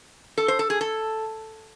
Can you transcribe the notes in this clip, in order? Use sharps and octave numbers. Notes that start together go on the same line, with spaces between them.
A4
C5
A4
G#4
A4